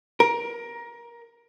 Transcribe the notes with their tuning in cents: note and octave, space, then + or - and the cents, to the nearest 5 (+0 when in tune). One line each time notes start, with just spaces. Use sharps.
A#4 +20